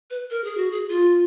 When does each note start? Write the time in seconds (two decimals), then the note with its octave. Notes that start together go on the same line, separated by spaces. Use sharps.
0.11 B4
0.30 A#4
0.44 G#4
0.57 F#4
0.71 G#4
0.90 F4